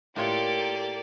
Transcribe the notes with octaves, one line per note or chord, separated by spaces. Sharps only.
A2 A#3 F4 G4 A4 C#5 D5